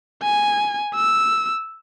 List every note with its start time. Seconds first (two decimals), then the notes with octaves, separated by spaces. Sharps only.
0.23 G#5
0.94 E6